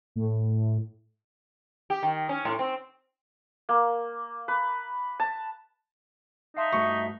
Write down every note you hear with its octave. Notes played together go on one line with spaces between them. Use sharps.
A2
G4
D#3
C#4
A2
C4
A#3
B4
A5
D#4 E5 F5 A5 C6
G2 A3 F#4 C#6